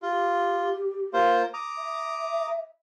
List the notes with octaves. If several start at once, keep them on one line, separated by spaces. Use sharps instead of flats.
F4 G4
A#3 F4 C5
A#5 D6 D#6
E5